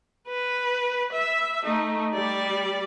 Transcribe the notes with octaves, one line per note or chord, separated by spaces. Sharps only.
B4
E5
A3 D#4
G3 D5